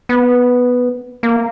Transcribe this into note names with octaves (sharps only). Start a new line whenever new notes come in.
B3
A#3